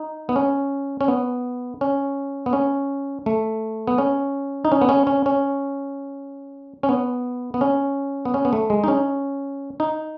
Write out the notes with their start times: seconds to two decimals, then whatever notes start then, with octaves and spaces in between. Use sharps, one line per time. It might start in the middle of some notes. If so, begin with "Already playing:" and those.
Already playing: D#4
0.29 B3
0.36 C#4
1.01 C#4
1.08 B3
1.81 C#4
2.46 B3
2.53 C#4
3.26 A3
3.87 B3
3.98 C#4
4.65 D#4
4.72 C#4
4.81 B3
4.89 C#4
5.07 C#4
5.26 C#4
6.83 C#4
6.89 B3
7.54 B3
7.61 C#4
8.25 B3
8.34 C#4
8.45 B3
8.53 A3
8.70 G#3
8.84 D#4
8.88 C#4
9.80 D#4